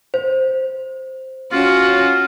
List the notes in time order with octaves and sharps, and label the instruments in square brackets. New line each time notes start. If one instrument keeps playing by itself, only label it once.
[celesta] C5
[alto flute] C#4 [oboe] F4 [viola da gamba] F#4